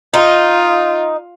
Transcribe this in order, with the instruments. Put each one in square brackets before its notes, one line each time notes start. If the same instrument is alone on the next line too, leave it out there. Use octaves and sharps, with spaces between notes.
[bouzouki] D#4 [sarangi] F4